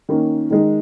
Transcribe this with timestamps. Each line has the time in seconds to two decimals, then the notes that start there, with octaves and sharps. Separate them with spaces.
0.09 D#3 A#3 C#4
0.50 D#3 G#3 D#4